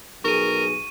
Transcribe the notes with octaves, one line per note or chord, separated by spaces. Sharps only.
B1 G#4 A#4 C#6 D#7